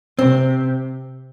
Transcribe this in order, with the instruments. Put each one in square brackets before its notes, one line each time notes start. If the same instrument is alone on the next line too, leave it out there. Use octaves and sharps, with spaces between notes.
[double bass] C3 [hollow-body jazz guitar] C4